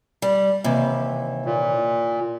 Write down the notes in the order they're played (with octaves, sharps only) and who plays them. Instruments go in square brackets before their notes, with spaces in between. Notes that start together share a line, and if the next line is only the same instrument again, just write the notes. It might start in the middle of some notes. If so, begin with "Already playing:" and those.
[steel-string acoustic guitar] G3
D#2 C3 E3
[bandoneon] A#2